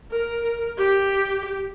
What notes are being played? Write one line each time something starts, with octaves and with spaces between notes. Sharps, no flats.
A#4
G4